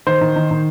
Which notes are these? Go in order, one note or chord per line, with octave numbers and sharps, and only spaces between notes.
D#3 C5
D#3
D#3
D#3